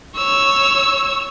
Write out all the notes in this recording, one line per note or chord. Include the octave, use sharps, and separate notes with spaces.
C#5 E6